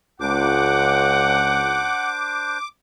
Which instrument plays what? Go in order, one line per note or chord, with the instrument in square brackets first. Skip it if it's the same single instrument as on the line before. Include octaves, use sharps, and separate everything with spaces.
[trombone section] C#2 [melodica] D4 C5 [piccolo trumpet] F#5 [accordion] D6